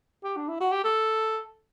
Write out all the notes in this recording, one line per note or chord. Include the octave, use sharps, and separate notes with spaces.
G4
D4
E4
F#4
G4
A4